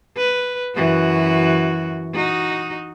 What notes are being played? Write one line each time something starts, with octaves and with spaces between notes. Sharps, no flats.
B4
F#2 E3 F#4
D#4 F#4